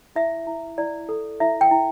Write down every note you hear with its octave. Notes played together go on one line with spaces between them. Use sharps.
E4 E5
E4
E4 D5
A4
E4 E5
G5
E4